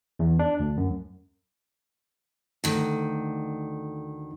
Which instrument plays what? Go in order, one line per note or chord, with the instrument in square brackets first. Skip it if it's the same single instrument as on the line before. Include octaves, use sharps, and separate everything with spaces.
[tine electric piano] E2
D4
D2
F#2
[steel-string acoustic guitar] D2 D#3